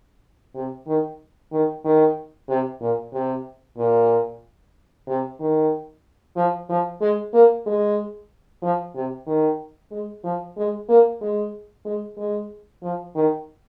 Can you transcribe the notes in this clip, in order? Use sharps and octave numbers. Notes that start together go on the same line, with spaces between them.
C3
D#3
D#3
D#3
C3
A#2
C3
A#2
C3
D#3
F3
F3
G#3
A#3
G#3
F3
C3
D#3
G#3
F3
G#3
A#3
G#3
G#3
G#3
F3
D#3